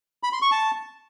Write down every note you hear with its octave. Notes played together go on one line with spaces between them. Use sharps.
B5
C6
C#6
A5